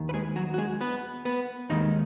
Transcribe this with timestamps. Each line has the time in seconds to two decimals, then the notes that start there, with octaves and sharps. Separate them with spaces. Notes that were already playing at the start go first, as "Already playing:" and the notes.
Already playing: D#2 D#3
0.09 B4
0.14 G#3 G#4
0.36 F#3 F#4
0.54 F#4
0.58 G#3 G#4
0.81 B3 B4
1.25 B3 B4
1.69 D#2 D#3 G#3 D#4 D#5